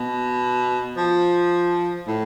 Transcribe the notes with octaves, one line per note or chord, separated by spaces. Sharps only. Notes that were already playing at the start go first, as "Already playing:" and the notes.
Already playing: B2
F3
A2